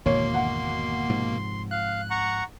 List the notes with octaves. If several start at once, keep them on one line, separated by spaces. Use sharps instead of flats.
G#1 E2 B2 D3 A#3 C#5 C6
F#5
G#2 C3 F3
F5 F#6
F#5 A#5 C#6